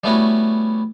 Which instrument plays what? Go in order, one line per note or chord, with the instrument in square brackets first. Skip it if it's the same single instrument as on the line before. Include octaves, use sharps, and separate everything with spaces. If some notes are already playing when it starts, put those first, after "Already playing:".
[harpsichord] G3 A3 B3 C#4 E4 F#4